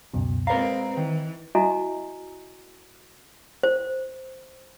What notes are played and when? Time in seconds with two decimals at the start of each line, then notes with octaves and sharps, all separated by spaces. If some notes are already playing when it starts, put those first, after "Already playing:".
0.14 C#2 F#2 B2
0.47 G#3 C4 A#4 B4 D5 F5 A#5
0.97 D#3 E3
1.55 E4 F#4 D#5 E5 G#5 A#5
3.63 C5